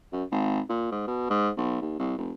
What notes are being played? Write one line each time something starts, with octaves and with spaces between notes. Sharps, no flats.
F#2
G#1
A#2
G#2
B2
G#2
B1
D#2
C2
F1